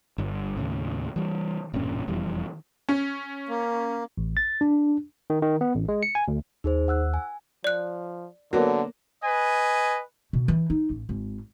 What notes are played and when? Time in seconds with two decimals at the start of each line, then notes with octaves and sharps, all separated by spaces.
0.18 G1 G2
0.57 D#2 A2 C#3
1.16 E3 G3
1.73 E1 G2 A#2 C#4
2.07 E1 F2 E3 G3
2.89 C#4
3.49 A#3
4.18 A1
4.37 A6
4.61 D4
5.30 D#3
5.42 D#3
5.61 B3
5.75 A1
5.89 G#3
6.03 C#7
6.15 G#5
6.28 D2
6.64 D#2 D#4 G#4 C5
6.88 F#5 E6 F#6
7.14 G#5
7.64 F3 D5 F#6
8.53 D3 F#3 A#3 B3
9.22 B4 D#5 G#5
10.33 B2
10.48 E3
10.70 D#4
10.90 A1
11.09 G#1